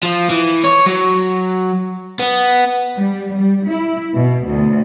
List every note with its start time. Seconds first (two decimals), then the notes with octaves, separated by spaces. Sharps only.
0.03 F3
0.30 E3
0.64 C#5
0.87 F#3
2.19 B3
2.96 G3
3.35 G3
3.67 E4
4.15 B2
4.47 D2